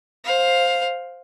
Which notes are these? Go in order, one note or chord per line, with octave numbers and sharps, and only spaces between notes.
C5 F5